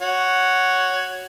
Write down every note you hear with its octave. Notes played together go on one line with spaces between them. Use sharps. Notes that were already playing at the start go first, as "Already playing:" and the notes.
F#4 C#5